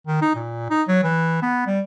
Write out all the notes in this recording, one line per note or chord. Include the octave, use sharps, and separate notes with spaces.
D#3
D#4
A#2
D#4
F#3
E3
B3
G3